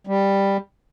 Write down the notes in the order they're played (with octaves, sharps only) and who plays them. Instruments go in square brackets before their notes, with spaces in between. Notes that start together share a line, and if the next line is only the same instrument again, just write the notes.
[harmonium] G3